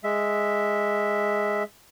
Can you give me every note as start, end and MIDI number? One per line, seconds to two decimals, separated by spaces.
0.04 1.63 56
0.04 1.63 76